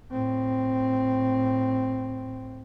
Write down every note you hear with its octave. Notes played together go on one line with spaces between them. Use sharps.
A2 C4